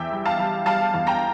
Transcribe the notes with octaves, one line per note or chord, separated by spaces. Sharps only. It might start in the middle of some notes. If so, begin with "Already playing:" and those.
Already playing: E2 E5 G5
G3
F5 A5
G3
G3 F5 A5
E2
G5 A#5